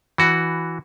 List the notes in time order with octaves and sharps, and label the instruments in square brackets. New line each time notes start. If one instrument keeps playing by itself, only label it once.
[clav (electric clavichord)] E3 F#4